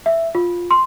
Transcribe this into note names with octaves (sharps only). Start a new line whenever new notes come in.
E5
F4
C6